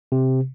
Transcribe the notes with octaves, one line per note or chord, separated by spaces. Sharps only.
C3